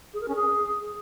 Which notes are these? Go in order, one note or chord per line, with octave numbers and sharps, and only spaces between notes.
G#4
A#4
C#4
G#4